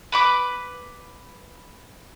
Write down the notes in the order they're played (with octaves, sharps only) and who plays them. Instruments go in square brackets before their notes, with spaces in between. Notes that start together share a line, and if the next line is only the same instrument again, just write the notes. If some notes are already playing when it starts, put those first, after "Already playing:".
[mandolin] B4 B5 D6